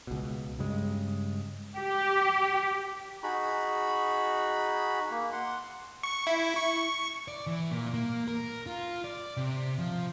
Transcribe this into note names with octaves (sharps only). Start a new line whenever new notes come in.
C#2 B2
G2 C#3 G#3
G4
D#4 F#4 G#4 B5
A#3
F#5 C6
C#6
E4
C#6
D5
E3
A#2
A#3
A#4
F4
D5
C3
F3